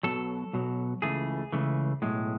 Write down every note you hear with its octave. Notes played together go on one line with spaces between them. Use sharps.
B1 B2 F#3 A4
B1 B2 F#3
C#2 C#3 E3 A3 G#4
C#2 C#3 E3 A3
B1 A2 G#3